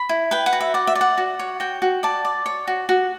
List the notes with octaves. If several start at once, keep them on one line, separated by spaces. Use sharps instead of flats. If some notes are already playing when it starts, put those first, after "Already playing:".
Already playing: B5
E4
B4 G5
F#5
F#4
E5
D5 F#5
E5
D5
F#5
F#4
C#5
F#4 G5
F#4
D5 A5
D5
C#5
F#4
F#4